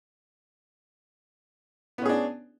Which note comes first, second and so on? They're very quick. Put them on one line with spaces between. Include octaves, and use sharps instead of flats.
B3 C#4 G#4 D4